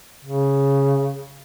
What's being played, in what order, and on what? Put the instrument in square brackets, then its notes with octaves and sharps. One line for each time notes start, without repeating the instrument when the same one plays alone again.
[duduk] C#3